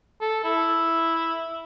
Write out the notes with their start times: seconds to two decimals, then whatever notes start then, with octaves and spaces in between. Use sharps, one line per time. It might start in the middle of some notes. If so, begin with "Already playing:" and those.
0.21 A4
0.44 E4